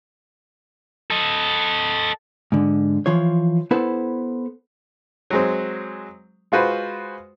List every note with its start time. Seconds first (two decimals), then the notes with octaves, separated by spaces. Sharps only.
1.11 A4 D#5
2.52 G#2 D3
3.06 E3 F3 F4 C#5
3.71 B3 E4 A4 B4 C5 F#5
5.30 F#3 G#3 C4
6.52 G#3 F4 F#4 B4 C5